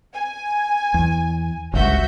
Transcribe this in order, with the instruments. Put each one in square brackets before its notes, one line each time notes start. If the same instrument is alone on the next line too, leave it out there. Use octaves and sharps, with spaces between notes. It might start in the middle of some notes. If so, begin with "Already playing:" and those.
[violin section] G#5
[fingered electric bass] E2
[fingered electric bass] G1 C#2 G2 [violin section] F#4 E5 G6